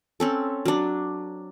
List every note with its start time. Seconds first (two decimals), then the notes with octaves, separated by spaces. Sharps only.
0.20 C4 C#4 A4
0.65 F#3 D4